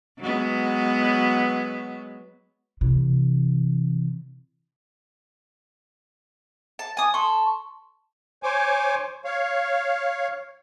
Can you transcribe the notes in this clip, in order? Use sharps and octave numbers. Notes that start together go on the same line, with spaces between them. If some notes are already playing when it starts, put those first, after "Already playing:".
F#3 G#3 B3
C3 E3
A5
G#5 D#6
A4 C6 C#6
C5 C#5 G#5 D6
C#5 F5